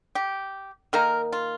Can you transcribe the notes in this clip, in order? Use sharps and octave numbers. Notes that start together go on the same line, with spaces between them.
G4
D#3 A#3 D#4 A#4
F4